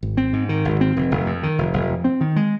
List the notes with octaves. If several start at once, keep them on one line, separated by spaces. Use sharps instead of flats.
G#1
C4
G#2
D#3
G#1
C4
F1
F1
F2
D#3
F1
F1
F2
C4
D#3
G#3